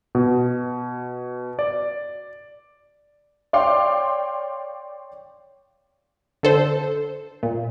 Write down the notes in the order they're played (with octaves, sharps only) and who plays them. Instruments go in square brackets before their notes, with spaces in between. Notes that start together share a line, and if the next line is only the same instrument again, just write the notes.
[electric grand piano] B2
D5
[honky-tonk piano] C#5 D5 F5 G5 C6 D6
[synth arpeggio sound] D3 A4 C5
A#2